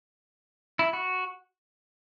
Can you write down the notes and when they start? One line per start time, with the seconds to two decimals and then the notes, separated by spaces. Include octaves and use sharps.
0.79 E4
0.93 F#4